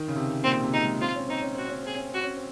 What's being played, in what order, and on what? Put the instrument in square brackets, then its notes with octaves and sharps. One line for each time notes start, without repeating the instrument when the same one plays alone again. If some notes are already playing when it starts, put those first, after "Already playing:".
Already playing: [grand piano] D#3
C#3
C3
[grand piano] A#2 [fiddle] C4
[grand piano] C3
[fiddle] D#4
[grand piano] G#3
[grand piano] C4 [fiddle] F4
[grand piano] C#4
[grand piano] C4 [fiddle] D#4
[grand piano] C#4
[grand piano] C4 [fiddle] F#4
[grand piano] C#4
[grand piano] C4 [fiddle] G#4
[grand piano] C#4
[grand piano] C4 [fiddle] F#4
[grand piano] C#4
C4